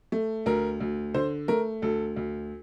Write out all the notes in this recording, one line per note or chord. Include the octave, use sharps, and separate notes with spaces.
A3
D2 A#4
D2
D3 C5
A3 A#4
D2 A4
D2